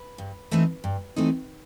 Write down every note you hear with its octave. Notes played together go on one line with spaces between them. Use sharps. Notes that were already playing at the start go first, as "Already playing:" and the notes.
Already playing: B4
G2
E3 A3 C4 D#4
G2
E3 A3 C4 D#4